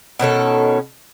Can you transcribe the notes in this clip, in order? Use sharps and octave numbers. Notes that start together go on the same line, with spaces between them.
B2 D#3 C#4 A4